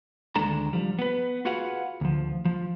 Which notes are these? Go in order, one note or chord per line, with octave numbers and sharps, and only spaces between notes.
D2 D#3 G#3 D4 A4 A#5
F3 G3
B3 B4
F4 F#4 G#4 B4 F5 F#5
D2 F3
F3